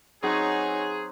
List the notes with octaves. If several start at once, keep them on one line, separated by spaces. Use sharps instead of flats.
F#3 C4 D#4 G#4 B4 C#5